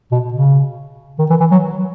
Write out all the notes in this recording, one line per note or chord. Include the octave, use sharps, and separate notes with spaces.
B2
C#3
D#3
E3
E3
F#3